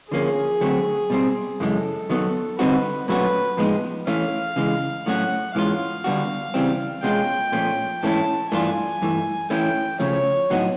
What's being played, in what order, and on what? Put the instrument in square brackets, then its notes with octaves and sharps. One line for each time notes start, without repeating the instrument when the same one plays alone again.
[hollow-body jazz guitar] D3 F3 A#3 C#4 [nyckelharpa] G#4
[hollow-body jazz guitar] D3 F#3 A3 C4
B2 G3 C4
[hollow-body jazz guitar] F#2 C#3 E3 G#3 [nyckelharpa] A4
[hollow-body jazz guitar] D#3 F#3 B3
[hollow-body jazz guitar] D3 G3 C4 D#4 F#4 [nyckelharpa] B4
[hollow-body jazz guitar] A#2 F#3 A3 C#4 F#4 [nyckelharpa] B4
[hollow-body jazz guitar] A2 F3 G#3 B3 D#4
[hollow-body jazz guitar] E3 A3 C#4 [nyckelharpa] F5
[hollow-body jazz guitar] C#3 E3 G#3
[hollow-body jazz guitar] A2 F#3 A3 C#4 F#4 [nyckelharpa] F#5
[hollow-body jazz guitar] G#2 E3 G#3 C#4 F4 [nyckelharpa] F5
[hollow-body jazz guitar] D3 G3 B3 D4 F#4
C#3 E3 G3 C4
[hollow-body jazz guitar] B2 G#3 C#4 F4 [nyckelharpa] G5
[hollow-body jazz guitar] A#2 F3 A3 C#4
[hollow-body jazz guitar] G#2 E3 A3 C#4 E4 [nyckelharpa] A5
[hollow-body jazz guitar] G2 E3 A3 D4 F4 [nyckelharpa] G#5
[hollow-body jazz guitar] G2 E3 A3
[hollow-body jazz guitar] E3 A3 C#4 E4 [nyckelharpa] G5
[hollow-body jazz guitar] C#3 F3 A3 [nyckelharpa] C#5
[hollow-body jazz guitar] A2 F#3 B3 D#4 F#4